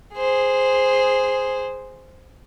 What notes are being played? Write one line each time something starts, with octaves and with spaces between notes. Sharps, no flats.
G#4 C5